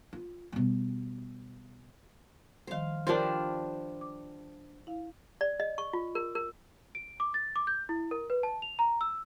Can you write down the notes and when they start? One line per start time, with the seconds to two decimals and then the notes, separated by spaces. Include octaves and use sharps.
0.13 F4
0.52 B2 G3
2.67 D#3 F3 G3 C5 F5
3.07 F3 G3 D4 F4 A#4 C5
4.01 D6
4.87 E4 F5
5.41 D5
5.60 D#5
5.78 C#6
5.93 F4
6.15 A#4
6.35 A#4
6.95 D7
7.20 D6
7.34 A6
7.56 D6
7.67 G6
7.89 E4
8.11 A#4
8.30 B4
8.43 A5
8.62 F7
8.79 A#5
9.01 E6